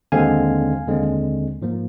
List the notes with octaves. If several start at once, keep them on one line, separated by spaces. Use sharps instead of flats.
D#2 D3 G#3 C4 F5 G#5
D#2 D3 G#3 C4
G#2 F3 A#3